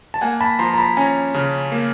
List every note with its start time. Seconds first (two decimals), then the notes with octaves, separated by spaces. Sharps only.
0.14 A5
0.21 A#3 F#5 G#5
0.41 A5 B5
0.59 F3 A#5 C6
0.74 A#5
0.78 A5 B5
0.97 C#4 G#5 A#5
1.34 C#3
1.72 A#3